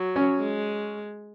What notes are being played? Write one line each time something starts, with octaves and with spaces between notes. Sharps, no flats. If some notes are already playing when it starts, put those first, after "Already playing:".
Already playing: F#3
C#4
G#3